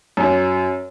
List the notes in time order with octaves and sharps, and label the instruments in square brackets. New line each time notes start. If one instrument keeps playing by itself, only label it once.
[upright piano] F#2